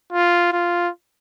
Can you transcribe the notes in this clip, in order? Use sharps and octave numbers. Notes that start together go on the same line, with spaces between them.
F4
F4